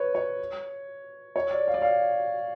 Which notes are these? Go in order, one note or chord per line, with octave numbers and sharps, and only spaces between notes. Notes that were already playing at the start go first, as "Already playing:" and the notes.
Already playing: B4 C#5
C#5
C#5
D5
F5
D5
F5